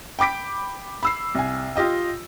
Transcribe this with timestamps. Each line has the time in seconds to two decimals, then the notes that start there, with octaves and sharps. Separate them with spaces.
0.19 G5 B5 D6 B6 D7
1.03 B5 E6 C7
1.35 C2 G#5
1.76 F4 G4 D#5 G5